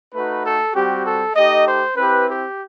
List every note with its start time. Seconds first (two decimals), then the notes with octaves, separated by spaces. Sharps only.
0.13 A3 D#4 F#4 B4
0.45 A4
0.74 G3 C4 F#4 G4
1.05 A4
1.36 A3 D#4 G4 D#5
1.66 C5
1.97 C4 E4 G4 B4
2.28 G4